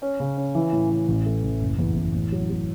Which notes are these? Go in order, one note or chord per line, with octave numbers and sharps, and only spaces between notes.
C#4
C#3
C#4
E3
A2
E3
A1
A3
A1
F#1
E2
E2
A2
F#3
F#3